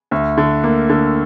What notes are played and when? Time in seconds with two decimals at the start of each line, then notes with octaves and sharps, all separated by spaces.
0.11 D2
0.38 D3
0.64 A#3
0.89 D3